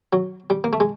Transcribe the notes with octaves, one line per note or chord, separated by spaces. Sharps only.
F#3
G3
A#3
A3
G#3